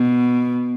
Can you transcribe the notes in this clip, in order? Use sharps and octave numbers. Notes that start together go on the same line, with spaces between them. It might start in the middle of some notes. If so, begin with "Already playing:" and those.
Already playing: B2